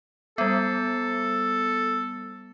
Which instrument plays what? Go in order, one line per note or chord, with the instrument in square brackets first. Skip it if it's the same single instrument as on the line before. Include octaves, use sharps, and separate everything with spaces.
[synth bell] G3 B3 [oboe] A4